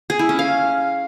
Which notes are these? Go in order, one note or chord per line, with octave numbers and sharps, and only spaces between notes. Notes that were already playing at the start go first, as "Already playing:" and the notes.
G#4
E4
C#4
F5